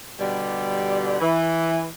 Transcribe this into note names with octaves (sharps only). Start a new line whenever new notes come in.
B2 D3 G3
E3